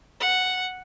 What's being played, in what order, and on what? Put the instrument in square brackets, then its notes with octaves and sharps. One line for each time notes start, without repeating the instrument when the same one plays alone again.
[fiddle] F#5